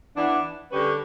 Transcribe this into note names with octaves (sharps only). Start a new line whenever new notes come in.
E3 B3 D4
D3 G3 C#4 G4 B4